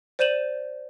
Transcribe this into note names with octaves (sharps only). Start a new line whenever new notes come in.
C5 D5 G6 D#7 E7 F#7